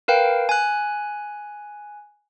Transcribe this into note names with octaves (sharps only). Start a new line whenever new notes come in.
A#4 B4 F5 G5
G#5 F#6